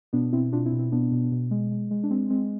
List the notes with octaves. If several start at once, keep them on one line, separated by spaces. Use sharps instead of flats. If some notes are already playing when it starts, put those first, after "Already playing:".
B2 B3 D4
B2 C4 E4
B2 D4 F4
C4 E4
B2
C4 E4
B2 B3 D4
B2
B2
G#3
G#3
G#3
D4
G#3 C4
G#3 C4